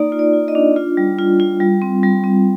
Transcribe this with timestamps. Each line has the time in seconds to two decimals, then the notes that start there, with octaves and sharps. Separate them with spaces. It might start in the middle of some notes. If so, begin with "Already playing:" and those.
Already playing: A#3 D#4 D5
0.12 F4
0.19 D5
0.33 F4
0.48 D#5
0.55 D4
0.76 F4
0.97 G3
1.19 F4
1.40 F4
1.60 G3
1.82 C4
2.03 G3
2.24 C4